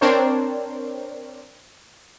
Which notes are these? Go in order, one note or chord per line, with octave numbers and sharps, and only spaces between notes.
C4 D4 A#4 C5 C#5